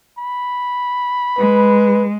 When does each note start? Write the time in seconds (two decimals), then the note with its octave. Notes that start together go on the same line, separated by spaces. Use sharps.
0.18 B5
1.38 G#3 B4